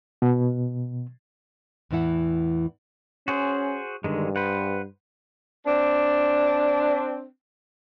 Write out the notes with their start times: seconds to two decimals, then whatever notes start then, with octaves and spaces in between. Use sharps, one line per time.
0.22 B2
1.91 E2 A2 E3 E4 F#5
3.28 C#4 F#4 G#4 C5
4.04 G2 D3 D#3 G#3
4.36 B4 C5 F#5
5.66 C4 D4